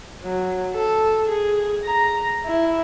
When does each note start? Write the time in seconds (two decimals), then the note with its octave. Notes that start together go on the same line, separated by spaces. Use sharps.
0.24 F#3
0.74 A4
1.28 G#4
1.83 A#5
2.47 E4